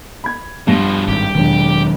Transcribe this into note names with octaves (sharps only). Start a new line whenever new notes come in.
B5 G#6
G2 B2 F3 A#6
G#1 G4
E1 D#3 F#3 D4